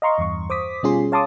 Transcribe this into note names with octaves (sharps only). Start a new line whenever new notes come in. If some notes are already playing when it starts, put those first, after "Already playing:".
D#5 F5 A#5 C6 C#6
E2 G2 C#6
C5 D6 D#6 B6
B2 G3 C#4 F4 G#4 C6
C#5 F5 A5 C6 D6 D#6